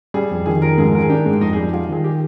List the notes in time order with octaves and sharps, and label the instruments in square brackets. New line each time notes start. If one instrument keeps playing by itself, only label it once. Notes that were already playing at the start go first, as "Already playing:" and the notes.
[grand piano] G3 [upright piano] G#4
[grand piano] F2
[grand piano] D#3 [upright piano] G#4
[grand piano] F2 [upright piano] A#4
[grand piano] G#2 [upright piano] G#4
[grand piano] D#3 [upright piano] A#4
[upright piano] G#4
[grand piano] D4 [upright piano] G4
[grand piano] G#2 [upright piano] G#3
[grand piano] F2 [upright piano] D#4
[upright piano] G#4
[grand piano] G3 [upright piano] G4
[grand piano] G3 [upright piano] F4
[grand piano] D#3 [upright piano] G#4
[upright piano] G4